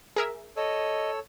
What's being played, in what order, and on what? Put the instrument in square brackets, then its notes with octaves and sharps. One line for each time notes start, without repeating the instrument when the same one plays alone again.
[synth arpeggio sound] G#4 A#4 E5
[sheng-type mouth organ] A4 C#5 E6 [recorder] D#5